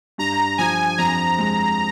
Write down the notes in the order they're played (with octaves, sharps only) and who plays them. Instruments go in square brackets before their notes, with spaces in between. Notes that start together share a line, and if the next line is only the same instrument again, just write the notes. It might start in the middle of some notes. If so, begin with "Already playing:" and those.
[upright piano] G2 [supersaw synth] A#5
[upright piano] F3 [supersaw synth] G#5
[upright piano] F2 [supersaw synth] A#5
[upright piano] G#3